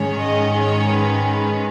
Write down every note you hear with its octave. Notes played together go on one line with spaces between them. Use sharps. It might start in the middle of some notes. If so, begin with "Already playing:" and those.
Already playing: G#2 D#3 G#3 C#4 C#5
D#5
C#5
B4
B4